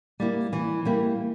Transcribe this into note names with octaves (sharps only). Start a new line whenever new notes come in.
G3 A#3 E4
E3
G3 A#3 E4